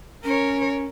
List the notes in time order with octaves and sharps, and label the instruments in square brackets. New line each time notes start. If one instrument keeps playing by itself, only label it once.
[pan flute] C#4 [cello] A#4 C#5